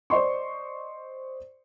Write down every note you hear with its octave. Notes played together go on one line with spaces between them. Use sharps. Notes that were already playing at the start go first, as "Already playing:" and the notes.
C5 D5 D#5 C6 C#6